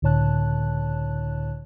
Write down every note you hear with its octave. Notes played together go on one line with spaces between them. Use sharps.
C#2 A2 D3 C#5 A5 F#6